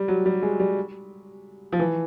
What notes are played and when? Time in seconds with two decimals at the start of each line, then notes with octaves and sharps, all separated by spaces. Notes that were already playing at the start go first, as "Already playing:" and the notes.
Already playing: G3
0.08 F#3
0.26 G3
0.42 G#3
0.60 G3
1.72 F3
1.79 E3